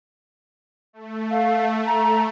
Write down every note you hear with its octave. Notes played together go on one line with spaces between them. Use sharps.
A3
F5
A#5